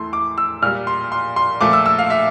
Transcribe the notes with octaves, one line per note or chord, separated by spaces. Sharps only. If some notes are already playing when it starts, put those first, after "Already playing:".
Already playing: E2 E3 A3 C6
D6
E6
A#2 G3 F6
C6
C6
C6
A#2 F3 A3 D6
E6
E6
F5
E5